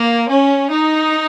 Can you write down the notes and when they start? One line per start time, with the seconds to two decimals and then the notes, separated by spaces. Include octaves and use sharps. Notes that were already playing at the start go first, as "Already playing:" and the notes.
Already playing: A#3
0.29 C#4
0.72 D#4